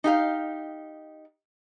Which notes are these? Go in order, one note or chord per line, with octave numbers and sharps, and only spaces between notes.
D#4 G4 F5